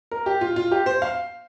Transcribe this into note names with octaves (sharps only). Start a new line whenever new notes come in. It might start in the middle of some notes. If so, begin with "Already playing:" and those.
A#4
G4
F4
F4
G4
C5
F5